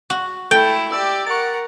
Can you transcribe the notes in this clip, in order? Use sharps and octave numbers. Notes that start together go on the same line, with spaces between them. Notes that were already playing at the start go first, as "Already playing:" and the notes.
F#4
A3 E4 A4 G5
G4 D5 E6
A#4 F#5 C#6 A6